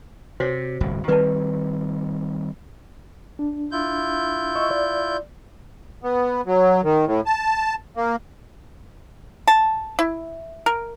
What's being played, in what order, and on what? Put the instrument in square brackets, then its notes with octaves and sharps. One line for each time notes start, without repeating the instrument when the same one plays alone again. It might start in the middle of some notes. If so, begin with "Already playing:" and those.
[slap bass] C3 [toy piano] F#4 C5 C#5
[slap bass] D1 G1 C2
[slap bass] D#3 G3 C4 [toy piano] B4 D5 A5
[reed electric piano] D4
[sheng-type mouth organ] E4 F4 G6
[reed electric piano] D#5 C#6 E6
D5
[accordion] B3
F#3
D#3
A2
A5
A#3
[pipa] A5
E4
A#4